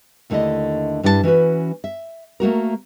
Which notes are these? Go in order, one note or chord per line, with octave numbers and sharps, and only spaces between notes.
D#2 D3 A3 E4 D5 D#5
G2 G3 D4 E4 A4 A5
E3 C#4 F#4 B4
E5
A3 A#3 F#4 A#4